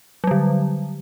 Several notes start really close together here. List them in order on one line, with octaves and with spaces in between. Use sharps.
F#3 G3 D3